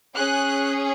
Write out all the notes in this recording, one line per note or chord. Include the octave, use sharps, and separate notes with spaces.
C#4 G#4 F#6